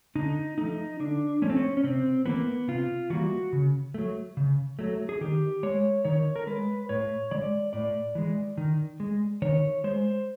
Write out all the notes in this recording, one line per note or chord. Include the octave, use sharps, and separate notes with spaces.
D3 D#4
F3 A3 D#4
D3 D4
F3 A3 C#4
C4
C#4
C#4
C3 C4
E3 G3 A#3 B3
C3 F4
E3 G3 A#3 F#4
C#3
F#3 A3
C#3
F#3 A3
G#4
D#3 G4
G#3 C#5
D#3 C#5
A#4
G#3 B4
A2 C#5
E3 G#3 D5
A2 D5
E3 G#3
D#3
G#3
D#3 C#5
G#3 C5